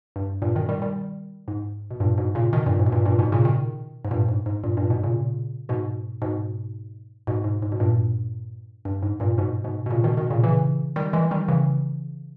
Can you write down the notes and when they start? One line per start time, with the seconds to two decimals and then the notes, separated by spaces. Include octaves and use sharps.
0.16 G2
0.42 G2 A#2
0.55 B2 D#3
0.69 D#3 G3
0.82 D#3 G3
1.48 G#2
1.91 B2
2.00 G2 A#2
2.18 G#2 B2
2.35 A#2 C#3
2.53 B2 D#3
2.66 G2 A#2
2.79 G#2
2.86 B2
2.92 G2 A#2
3.05 G2 A#2
3.19 G#2 B2
3.32 A#2 C#3
3.45 B2 D#3
4.05 G#2
4.11 G2 A#2
4.29 G#2
4.46 G#2
4.64 G2 A#2
4.77 G2 A#2
4.90 G#2 B2
5.04 A#2 C#3
5.69 G#2 B2
6.22 G#2 B2
7.27 G#2 B2
7.44 G#2
7.62 G#2
7.72 B2
7.80 G2 A#2
8.85 G2
9.03 G#2
9.20 G2 A#2
9.38 G#2 B2
9.64 G#2 B2
9.86 B2
9.91 A#2 C#3
10.04 B2 D#3
10.17 B2 D#3
10.30 A#2 C#3
10.44 C#3 E3
10.96 D#3 G3
11.13 E3 G#3
11.31 D#3 G3
11.48 C#3 E3